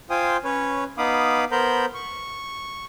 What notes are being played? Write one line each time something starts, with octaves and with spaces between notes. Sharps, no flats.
F4 C5 F5 G5 G#5 D#6
C#4 B4 C#5
B3 D#4 F5 B5 D6 D#6
B3 A#4 C5 A#5 B5 G6
C#6